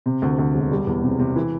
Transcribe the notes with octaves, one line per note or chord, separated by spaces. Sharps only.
C3
D2
D2
E1
G3
E2
C3
C3
E3